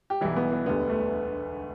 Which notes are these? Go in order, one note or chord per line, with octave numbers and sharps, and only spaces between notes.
G4
B1 B2 E3 G3 E4
B3
B3
E1 D2 D3 G3 B3
A3